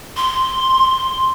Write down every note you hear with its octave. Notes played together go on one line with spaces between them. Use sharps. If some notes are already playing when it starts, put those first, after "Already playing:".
C6